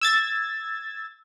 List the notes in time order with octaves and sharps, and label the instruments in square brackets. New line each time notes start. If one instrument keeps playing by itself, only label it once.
[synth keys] E6 G#6 A6